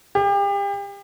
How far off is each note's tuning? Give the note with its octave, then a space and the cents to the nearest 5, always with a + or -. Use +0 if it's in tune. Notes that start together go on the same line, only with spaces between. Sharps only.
G4 +35